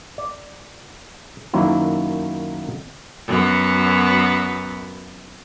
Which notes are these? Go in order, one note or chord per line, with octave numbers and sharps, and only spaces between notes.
D5
F#2 D#3 F#3 A#3 E4
F#2 B3